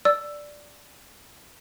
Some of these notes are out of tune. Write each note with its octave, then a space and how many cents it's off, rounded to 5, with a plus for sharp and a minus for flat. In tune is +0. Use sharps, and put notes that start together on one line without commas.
D5 +0 E6 +10